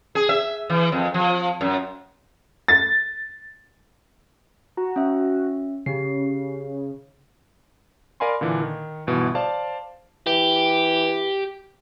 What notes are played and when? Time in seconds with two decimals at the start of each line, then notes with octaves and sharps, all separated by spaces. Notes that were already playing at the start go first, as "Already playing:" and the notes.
0.15 G#4
0.29 E5
0.70 E3
0.92 F2
1.14 F3
1.61 F#2
2.68 A6
4.77 F#4 A#5
4.96 C#4 E5
5.86 C#3 G4 C7
8.20 A#4 D5 F5 G#5 B5 C6
8.41 A#2 D3 E3
8.62 D#3
9.07 G1 B2 E3
9.35 C5 D5 F5 A5
10.27 E3 G4